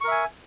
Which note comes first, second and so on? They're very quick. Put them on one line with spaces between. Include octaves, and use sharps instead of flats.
C#6 A#4 E5 G#5